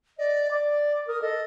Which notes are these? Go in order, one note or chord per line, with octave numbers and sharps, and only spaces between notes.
D5 D#5
D5 D6
A#4 D#6
A4 D#5